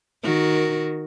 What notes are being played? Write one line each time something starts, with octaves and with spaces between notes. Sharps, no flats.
D#3 F#4 A#4